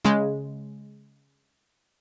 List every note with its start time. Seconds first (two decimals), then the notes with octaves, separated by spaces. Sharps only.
0.04 C#3 G#3